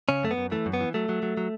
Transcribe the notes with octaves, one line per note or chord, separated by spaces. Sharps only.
C#3 C#4
F#2 A3
B3
F#2
E3 A3
F#2
B3
E3
F#3 A3
F#3
F#3
F#3